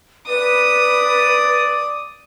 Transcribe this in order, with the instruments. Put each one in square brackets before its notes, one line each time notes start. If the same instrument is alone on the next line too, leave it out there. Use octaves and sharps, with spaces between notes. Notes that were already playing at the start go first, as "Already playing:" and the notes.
[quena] B4 [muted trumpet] D5 [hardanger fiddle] D#6